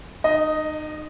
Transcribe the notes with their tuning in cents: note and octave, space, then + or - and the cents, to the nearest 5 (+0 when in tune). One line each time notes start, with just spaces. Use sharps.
D#4 -30 D#5 +0